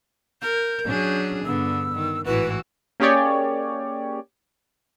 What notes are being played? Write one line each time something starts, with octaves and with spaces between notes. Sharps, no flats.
A#4 G6
F#3 C#4 D4 G#4
G2 D3 B3 E6
D#3
A1 G#2 E3 E4 F#4 B4
A#3 C#4 G4 G#4 C#5 D5